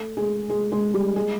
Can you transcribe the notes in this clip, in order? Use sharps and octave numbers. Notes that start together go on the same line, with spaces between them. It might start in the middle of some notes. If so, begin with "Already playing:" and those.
Already playing: A3 A4
G#3 G#4
G#3 G#4
G#3 G#4
G3 G4
G#3 G#4